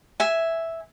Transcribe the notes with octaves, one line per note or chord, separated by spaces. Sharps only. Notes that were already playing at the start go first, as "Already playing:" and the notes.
E5 G#5